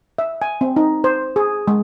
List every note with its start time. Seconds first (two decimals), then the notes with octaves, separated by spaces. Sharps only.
0.19 E5
0.42 G#5
0.61 C4
0.76 D#4
1.04 C5
1.36 G#4
1.68 G#3